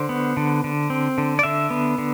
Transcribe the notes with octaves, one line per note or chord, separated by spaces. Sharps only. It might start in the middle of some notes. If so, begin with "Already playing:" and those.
Already playing: D3 C5
B3
D3
D3
C4
D3
D5
D3 E5
B3
D3